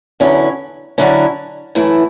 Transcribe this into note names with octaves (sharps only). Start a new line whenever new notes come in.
E2 D3 F#3 C#4 E4
D3 F#3 C#4 E4
F#2 E3 A3 E4